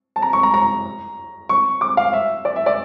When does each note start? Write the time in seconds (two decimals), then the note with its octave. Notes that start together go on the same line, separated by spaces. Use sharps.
0.16 A5
0.22 A#5
0.33 C#6
0.43 A#5
0.54 A#5
1.49 C#6
1.81 D6
1.97 F5
2.13 E5
2.45 D5
2.56 E5
2.66 D5